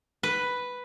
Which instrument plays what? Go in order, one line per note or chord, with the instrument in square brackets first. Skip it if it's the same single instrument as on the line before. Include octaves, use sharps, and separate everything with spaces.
[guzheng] B4